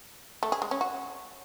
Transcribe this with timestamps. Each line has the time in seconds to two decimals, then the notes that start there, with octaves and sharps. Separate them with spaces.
0.43 A3
0.52 G#4
0.62 G#3
0.71 C#4
0.81 F#4